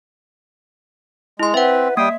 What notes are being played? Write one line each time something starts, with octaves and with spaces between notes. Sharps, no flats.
G#3 E4 C6
C4 B4 E5 F#5
G3 A#3 E5 G5 D#6